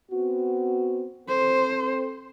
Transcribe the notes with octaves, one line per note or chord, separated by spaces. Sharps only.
B3 C4 F#4
C4 A4 C5